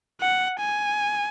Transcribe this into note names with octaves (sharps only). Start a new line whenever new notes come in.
F#5
G#5